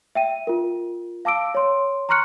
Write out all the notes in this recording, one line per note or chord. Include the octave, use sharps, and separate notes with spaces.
E5 G5 D#7
F4 A#4
F5 A5 D6 E6 D7
C#5 C6
A#5 C6 C#6 F6 F#6 C#7